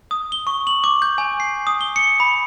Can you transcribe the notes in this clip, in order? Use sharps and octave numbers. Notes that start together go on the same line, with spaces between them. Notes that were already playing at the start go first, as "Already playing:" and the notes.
D#6
G7
C#6
F#7
D6
G6
G#5
C7
D#6
G7
C#7
B5